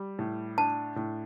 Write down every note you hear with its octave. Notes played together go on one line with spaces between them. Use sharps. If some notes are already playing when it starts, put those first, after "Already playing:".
Already playing: G3
A2
D4 A5
A2